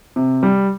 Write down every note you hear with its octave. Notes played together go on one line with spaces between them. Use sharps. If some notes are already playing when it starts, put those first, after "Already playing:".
C3
G3